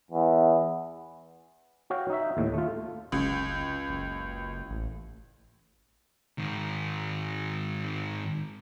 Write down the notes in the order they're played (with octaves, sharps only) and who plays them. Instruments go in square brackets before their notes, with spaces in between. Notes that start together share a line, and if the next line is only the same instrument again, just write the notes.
[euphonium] E2
[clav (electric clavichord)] F#4 C#5 F5 G5
D#4 E5
D#2 A2
A3 F4
[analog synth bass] F#1 [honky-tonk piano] C#2
[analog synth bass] F#1
A1
[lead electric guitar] G#2 D#3